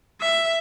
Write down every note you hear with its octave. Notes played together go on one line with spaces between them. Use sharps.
E5